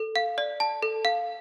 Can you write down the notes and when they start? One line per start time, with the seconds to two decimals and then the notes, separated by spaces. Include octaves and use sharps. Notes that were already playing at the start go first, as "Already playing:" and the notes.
Already playing: A4
0.16 F5
0.38 D5
0.60 A5
0.82 A4
1.05 F5